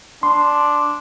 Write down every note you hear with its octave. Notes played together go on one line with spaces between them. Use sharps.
D4 C6